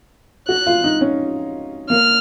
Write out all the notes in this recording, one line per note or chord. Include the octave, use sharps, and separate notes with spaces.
F#4 F#6
F4
D#4
C#4
A#3 F6